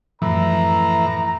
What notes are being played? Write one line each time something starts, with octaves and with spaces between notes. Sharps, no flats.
F#2 A2 E3 F3 A#5